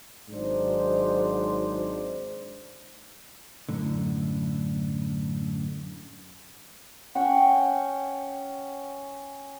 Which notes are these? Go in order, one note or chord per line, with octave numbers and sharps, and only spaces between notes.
G#1 G#2 F#3 D4 D#4 C5
F#2 A2 D3
C#4 C#5 F#5 G5